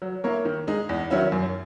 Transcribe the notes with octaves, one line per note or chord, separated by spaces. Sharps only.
F#3
A#3 E4 A#4 C#5
D#3
G#3 D#4 G#4
E2
D#3 F#3 C#4 E4
F#2